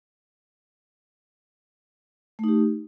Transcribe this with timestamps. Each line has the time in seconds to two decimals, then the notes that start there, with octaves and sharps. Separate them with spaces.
2.39 A3
2.44 D#4
2.48 G4